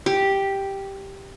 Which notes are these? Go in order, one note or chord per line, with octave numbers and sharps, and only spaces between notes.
G4